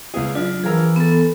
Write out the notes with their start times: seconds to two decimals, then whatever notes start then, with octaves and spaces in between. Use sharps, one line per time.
0.14 C#2 B3 E4 G#4
0.35 F#3 D4 F4
0.64 E3 F3 G#4 A#4 E6
0.96 B3 A4